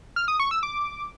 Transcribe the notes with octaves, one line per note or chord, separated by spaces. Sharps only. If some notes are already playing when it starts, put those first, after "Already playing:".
F6
D#6
C#6
E6
D6